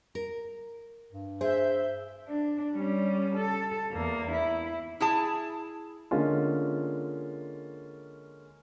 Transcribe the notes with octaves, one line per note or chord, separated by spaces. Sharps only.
A#4
G2
G#4 C5 E5 G6
D4
G3 C#4
A4
E2 A#3
E4
E4 G#4 A5
D3 G#3 A#3 C#4 F4